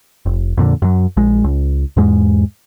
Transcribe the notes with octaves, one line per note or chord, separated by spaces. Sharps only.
F1
F2 A#2 D3
F#2 F#3
A#1 G#3
C#2
E2 G#2 G#3